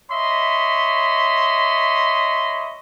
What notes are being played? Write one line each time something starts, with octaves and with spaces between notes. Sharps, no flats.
C#5 D#5 E5 B5 C6